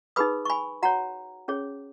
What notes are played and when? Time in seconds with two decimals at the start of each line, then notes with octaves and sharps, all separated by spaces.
0.16 D#4 G#4 B4 B5 D#6
0.45 C#6
0.50 G#5 B5
0.82 F#4 C#5 F#5 A#5
1.48 C#4 G#4 C#5